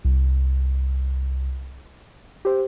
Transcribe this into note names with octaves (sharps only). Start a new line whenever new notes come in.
C2
G4 C5